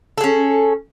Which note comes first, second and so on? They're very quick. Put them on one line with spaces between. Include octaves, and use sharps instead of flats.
A4 G#4 C#4